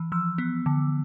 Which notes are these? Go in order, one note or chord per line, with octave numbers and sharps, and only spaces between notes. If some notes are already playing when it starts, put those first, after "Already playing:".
Already playing: E3
F3 E6
B3
D3